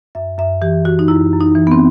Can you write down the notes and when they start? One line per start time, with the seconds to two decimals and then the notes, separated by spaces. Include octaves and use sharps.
0.15 F#2 E5
0.38 F#2 E5
0.62 E3 G4
0.85 E3 F#4
0.99 D#4
1.08 F#2 E4
1.33 F#2
1.41 D#4
1.55 E3
1.67 B3
1.71 C4